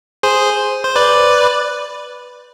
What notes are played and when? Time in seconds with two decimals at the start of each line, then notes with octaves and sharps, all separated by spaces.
0.23 G#4 C5
0.84 C5
0.96 B4 D5